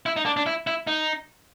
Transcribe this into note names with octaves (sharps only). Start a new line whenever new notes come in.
E4
D#4
D4
D4
E4
E4
D#4